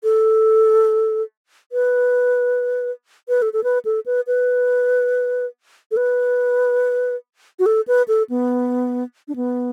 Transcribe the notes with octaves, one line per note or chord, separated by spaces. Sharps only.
A4
B4
B4
A4
A4
B4
A4
B4
B4
A4
B4
F#4
A4
B4
A4
B3
D4
B3